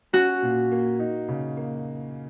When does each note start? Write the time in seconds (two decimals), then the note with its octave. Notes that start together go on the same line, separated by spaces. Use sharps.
0.13 C#4 F#4
0.42 A#2
0.71 A#3
0.99 D#4
1.29 C#3
1.57 A#3